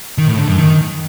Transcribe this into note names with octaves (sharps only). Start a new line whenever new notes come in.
D#3
A2
D3
F#2
D#3